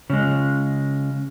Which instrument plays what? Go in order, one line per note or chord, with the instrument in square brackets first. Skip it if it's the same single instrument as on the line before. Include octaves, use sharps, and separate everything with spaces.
[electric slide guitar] C#3 G#3